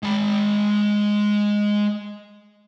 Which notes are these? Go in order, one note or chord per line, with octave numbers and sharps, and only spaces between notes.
G#3 B5